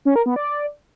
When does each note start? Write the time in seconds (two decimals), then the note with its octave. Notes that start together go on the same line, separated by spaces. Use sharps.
0.05 C#4
0.16 A#4
0.26 B3
0.36 D5